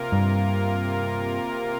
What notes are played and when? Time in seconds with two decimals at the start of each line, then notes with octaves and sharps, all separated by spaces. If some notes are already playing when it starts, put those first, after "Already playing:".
Already playing: C3 A#3 F4 A#4
0.12 G2